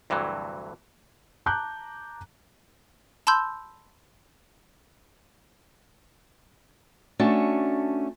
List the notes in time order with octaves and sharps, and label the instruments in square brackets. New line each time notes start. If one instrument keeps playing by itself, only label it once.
[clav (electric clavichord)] D2 G2 C3 E3 F#3
[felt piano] A5 A#5 D6 F#6 G6
[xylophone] A5 B5 C6 E6 G6
[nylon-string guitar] A3 C#4 D4 F#4